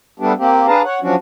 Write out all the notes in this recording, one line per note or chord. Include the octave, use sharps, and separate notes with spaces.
G3 A3 B3 D4 G4
A#3 C4 G4
D4 G#4 B4 F5 A5 A#5
C#5 F#5
F3 F#3 C#4 D4 F#4